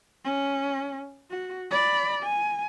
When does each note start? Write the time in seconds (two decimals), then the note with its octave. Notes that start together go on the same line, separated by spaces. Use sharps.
0.25 C#4
1.30 F#4
1.71 D5 B5
2.23 G#5